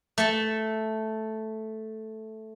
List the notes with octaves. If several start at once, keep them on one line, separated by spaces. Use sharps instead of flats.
A3 A5